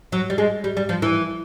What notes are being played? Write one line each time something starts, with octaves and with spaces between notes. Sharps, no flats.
F#3
G3
G#3
G3
G3
F3
E3